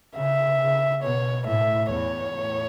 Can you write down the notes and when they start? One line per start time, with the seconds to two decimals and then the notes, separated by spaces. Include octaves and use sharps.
0.16 C#3 E5
0.60 C#3
1.03 B2 C#5
1.47 A2 E5
1.91 E2 C#5
2.34 A2